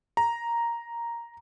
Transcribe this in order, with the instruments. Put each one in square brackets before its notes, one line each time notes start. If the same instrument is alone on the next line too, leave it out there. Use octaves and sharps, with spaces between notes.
[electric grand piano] A#5